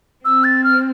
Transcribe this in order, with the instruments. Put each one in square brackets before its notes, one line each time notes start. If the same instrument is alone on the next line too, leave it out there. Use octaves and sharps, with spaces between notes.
[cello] C4 [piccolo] E6
[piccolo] A6
F6